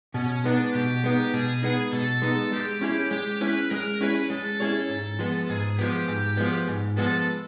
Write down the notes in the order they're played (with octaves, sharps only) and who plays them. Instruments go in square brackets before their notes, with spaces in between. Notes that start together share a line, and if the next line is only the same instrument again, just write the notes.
[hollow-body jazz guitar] B2 [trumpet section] C#4
[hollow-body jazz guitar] G#3 B3 D#4 [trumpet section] D4
[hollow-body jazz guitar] B2 [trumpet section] G4
[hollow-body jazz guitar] G#3 B3 D#4
[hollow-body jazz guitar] B2 [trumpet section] G#4
[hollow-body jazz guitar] G#3 B3 D#4 [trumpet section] G#4
[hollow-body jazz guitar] B2 [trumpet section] A4
[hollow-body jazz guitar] G#3 B3 D#4
[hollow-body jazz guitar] G#3 [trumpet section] G4
[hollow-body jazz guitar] C#4 E4 G#4 C#5 [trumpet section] G4
[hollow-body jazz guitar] G#3 [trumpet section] G4
[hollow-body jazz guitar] C#4 E4 G#4 C#5 [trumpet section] B4
[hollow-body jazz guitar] G#3 [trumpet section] A#4
[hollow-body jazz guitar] C#4 E4 G#4 C#5 [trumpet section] B4
[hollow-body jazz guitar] G#3 [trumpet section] A4
[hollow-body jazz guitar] C#4 E4 G#4 C#5
G#2
F3 G#3 B3
[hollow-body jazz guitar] G#2 [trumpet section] G#4
[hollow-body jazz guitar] F3 G#3 B3 [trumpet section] G4
[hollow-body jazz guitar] G#2
F3 G#3 B3
G#2
[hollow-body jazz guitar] F3 G#3 B3 [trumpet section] A4